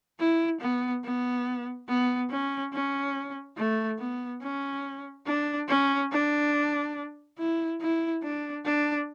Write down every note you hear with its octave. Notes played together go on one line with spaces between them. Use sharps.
E4
B3
B3
B3
C#4
C#4
A3
B3
C#4
D4
C#4
D4
E4
E4
D4
D4